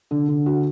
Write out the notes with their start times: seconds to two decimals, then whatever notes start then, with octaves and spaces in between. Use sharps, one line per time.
0.11 D3
0.28 D3
0.46 F#4